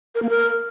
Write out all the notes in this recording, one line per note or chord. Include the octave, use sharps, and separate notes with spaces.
A#4
A#3
A#4